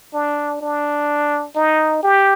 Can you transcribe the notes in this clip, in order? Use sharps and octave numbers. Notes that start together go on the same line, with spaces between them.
D4
D4
D#4
G4